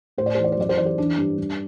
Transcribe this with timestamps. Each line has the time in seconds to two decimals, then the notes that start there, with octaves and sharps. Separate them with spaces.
0.18 A2 C5
0.26 D5
0.35 E3 C5
0.44 D5
0.52 C5
0.58 F#2 D5
0.69 C5
0.77 E3 D5
0.86 C5
0.98 E3 D4
1.18 G2
1.38 G2